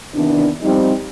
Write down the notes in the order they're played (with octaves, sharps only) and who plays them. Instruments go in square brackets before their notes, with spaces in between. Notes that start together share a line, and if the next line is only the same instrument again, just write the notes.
[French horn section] C3 D#3 E3 B3 D4
F3 G3 C4 D#4